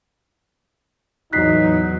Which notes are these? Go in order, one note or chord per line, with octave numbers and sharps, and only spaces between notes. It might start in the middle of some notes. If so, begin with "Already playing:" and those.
E2 A2 F#3 D#4 F#6 B6 C7